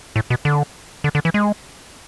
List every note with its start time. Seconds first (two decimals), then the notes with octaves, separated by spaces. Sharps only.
0.16 A2
0.30 B2
0.45 D3
1.04 D3
1.15 D3
1.25 E3
1.34 G#3